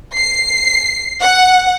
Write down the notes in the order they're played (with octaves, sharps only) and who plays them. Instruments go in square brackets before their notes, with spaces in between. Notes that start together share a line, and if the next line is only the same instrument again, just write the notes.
[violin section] C7
F#5